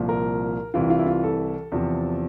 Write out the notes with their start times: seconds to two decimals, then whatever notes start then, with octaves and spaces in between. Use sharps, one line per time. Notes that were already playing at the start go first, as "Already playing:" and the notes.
Already playing: C2 A#2 F3
0.09 A#4
0.74 C2 C3 E3 F4
0.90 F4
0.99 E4
1.06 F4
1.23 A4
1.72 E2 C3 F3